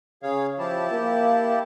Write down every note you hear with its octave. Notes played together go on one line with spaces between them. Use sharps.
C#3 G#4 C#5 F5
F3 E4 G4 A5
A#3
F5